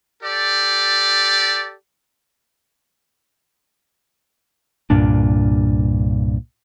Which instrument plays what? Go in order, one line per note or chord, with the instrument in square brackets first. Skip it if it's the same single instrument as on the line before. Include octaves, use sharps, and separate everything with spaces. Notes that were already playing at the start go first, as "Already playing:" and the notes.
[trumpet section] G4 A4 D5
[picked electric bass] C2 G2 A#2 D4